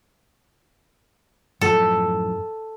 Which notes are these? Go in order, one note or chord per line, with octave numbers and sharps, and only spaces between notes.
F#2 A2 F3 A4